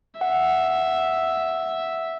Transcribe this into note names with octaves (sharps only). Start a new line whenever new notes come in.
E5 F#5